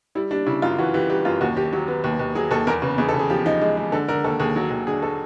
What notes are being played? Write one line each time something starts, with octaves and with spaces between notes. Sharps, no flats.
G3 E4
G3 D4
C#3 E4
F#2 F4
E3 F#4
E3 G4
G3 G4
F#2 F4
D#2 F#4
D#2 G4
F#3 G4
B3
D#2
D#2
F#3 G#4
D#2 A4
E2 A#4
C#3 B4
E2 G#4
A4
C#3
G#4
F3 G4
F3 D#4
G#3
G#3
D3 A4
D3 A#4
D#2 A4
D#2 G#4
F#3
D#2
D3 G#4
A4